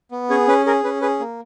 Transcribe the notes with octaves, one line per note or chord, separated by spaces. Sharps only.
B3
C#4 G#4 C#5
C#4 B4
G#4 A#4
C#4 B4
G#4 B4
A#3